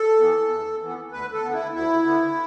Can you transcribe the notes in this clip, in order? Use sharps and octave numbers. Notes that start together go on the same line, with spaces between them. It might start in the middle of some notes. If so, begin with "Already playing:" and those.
Already playing: A4
E3 B3
E2
E3 B3
D2 B4
A4
D3 B3
E4
D2 E4
D3 B3